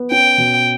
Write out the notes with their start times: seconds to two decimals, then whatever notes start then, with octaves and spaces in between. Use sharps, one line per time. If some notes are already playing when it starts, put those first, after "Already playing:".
Already playing: B3
0.12 C#4 G5
0.38 B2